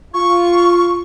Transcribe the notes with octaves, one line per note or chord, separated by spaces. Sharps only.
F4 C#6